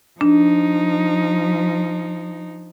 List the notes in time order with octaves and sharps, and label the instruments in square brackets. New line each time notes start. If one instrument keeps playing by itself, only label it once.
[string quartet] F3 D#4 [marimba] D4